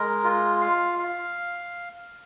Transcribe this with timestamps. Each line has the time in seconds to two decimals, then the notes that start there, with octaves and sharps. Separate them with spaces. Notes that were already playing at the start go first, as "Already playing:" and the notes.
Already playing: G#3 A#4
0.24 F4
0.61 F5
0.99 F5